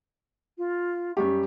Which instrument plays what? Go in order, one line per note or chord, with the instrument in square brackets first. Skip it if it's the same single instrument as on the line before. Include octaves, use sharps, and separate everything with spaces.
[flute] F4
[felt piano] F#2 G3 G4 [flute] C#6